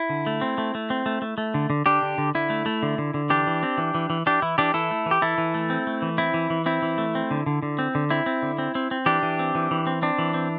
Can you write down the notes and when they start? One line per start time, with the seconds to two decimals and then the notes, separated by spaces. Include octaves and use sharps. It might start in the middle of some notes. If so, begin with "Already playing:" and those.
Already playing: E4
0.10 D3
0.27 A3
0.41 C4
0.58 A3
0.75 A3
0.90 C4
1.06 A3
1.22 A3
1.38 A3
1.54 D3
1.70 D3
1.86 D3 D4 G4
2.02 D3
2.18 D3
2.35 D3 E4
2.50 A3
2.66 A3
2.83 D3
2.98 D3
3.14 D3
3.30 E3 D4 G4
3.47 E3
3.63 C4
3.78 E3
3.95 E3
4.10 E3
4.26 E3 D4 G4
4.42 E3 E4
4.58 E3 D4 G4
4.74 E3 E4 A4
4.91 A3
5.06 E3
5.11 G4
5.22 E3 E4 A4
5.38 E3
5.54 A3
5.70 C4
5.87 A3
6.02 E3
6.18 C4 E4
6.34 E3
6.50 E3
6.66 C4 E4
6.82 E3
6.98 A3
7.15 C4
7.31 D3
7.46 D3
7.63 D3
7.79 C4
7.95 D3
8.10 C4 E4
8.26 C4
8.43 D3
8.58 C4
8.75 C4
8.91 C4
9.06 E3 D4 G4
9.23 E3
9.39 C4
9.55 E3
9.71 E3
9.87 C4
10.02 C4 D4
10.18 E3
10.34 C4